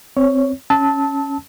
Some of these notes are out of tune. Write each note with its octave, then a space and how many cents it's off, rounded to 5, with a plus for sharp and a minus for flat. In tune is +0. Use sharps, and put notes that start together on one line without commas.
C4 +0 C#5 +10
C#4 +0 A5 +0 E6 -35